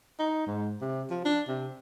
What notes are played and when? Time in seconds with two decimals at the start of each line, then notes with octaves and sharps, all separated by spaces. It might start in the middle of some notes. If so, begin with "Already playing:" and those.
0.19 D#4
0.47 G#2
0.81 C3
1.10 F3
1.25 D4
1.48 C3